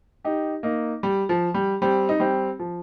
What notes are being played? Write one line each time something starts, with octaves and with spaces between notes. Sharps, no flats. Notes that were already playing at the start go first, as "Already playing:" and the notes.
D#4 G4
A#3 D#4
G3
F3
G3
G3 C4
D#4
G3 C4
F3